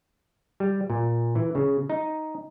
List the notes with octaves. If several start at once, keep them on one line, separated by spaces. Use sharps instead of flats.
G3
A#2
E3
C#3
D#4